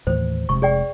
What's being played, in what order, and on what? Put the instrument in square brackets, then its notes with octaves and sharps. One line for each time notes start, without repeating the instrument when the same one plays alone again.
[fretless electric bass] D#2 A2 E3 [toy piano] C5
[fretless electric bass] F1 C3 G#3 [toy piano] C#6
[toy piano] G#4 D5 G5